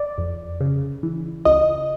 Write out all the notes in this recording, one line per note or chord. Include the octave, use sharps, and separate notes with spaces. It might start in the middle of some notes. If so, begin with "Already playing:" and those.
Already playing: D5
F2
C#3
E3
C#2 D#5